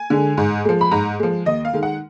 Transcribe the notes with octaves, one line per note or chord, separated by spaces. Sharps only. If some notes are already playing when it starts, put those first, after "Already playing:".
Already playing: G#5
D3 G#3
G#2
F3 G#3
B5
G#2 A#5
F3 G#3
D#2 D#5
F5
D#3 G#3
F#5